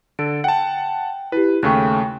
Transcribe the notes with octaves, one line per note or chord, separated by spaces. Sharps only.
D3 A4 D7
F#5 G5 A5
E4 G4 B4
D#2 C#3 A3 G5 C#6 F#6